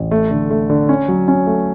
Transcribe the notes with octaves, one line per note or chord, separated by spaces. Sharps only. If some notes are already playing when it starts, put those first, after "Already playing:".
Already playing: A1
A3
D3
A3
D3
C#4
F#3
C#4
A3